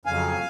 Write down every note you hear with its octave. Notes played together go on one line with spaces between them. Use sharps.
F2 C#3 F#3 F5 G#5